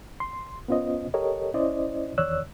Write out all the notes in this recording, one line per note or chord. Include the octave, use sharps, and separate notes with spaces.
C6
B3 C#4 F4 C5 D#5
G4 A4 A#4 C#5 D#5
C#4 E4 C5 D5 D#5
E2 D#3 C#5 D5 E6 F#6